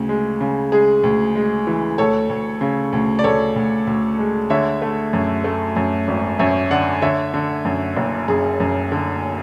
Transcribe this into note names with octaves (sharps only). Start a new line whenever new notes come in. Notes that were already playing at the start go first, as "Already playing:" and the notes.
Already playing: D2 C#3
G#3
C#3
G#3 G#4
D2
G#3
E3
D2 A4 C#5
D2
C#3
D2
D5
D2 A4 C#5
D2
D2
G#3
D3 C#5 E5
A3
F#2
A3
F#2
G#1
F#2 C#5 E5
D3 D5 F#5
D3 C#5 E5
D3
F#2
F#1
F#2 G#4
F#2
D3